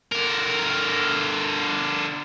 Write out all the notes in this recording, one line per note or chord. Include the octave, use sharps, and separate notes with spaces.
D3 A#4